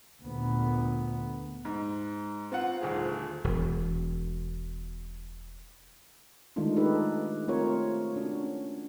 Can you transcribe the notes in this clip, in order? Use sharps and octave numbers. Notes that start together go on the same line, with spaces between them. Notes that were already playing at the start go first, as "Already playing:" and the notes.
D2 A#2 B3
G#2
C4 F4 F#5
D#1 D2 G#4
E1 B2
D#3 G#3 A3 D4 D#4 F4
D#4 G4 A4 B4
A3 C4 F4 G4 A#4 C#5
C#4 D4 F#4